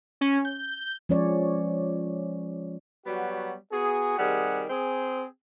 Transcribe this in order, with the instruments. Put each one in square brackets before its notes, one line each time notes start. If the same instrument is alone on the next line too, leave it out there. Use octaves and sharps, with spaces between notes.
[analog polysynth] C#4
G6
[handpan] F3 G#3 C#4 C#5 D5
[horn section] F#3 G3 B3 F#4
B3 F#4 G#4
C3 D#3 G3 G#4 F#5
C4 G#4